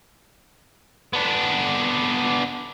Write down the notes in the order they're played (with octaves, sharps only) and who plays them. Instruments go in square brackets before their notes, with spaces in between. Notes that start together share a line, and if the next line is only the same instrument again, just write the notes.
[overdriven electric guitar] B3 D4